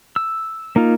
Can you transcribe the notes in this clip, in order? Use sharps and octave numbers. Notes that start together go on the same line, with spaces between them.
E6
A#3 D#4 F4